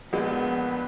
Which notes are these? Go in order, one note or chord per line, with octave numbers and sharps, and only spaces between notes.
A#1 G#3 B3 F#4